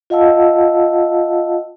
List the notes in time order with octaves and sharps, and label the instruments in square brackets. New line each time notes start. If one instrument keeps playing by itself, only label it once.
[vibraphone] F4 D#5 F5 F#5 A5 E6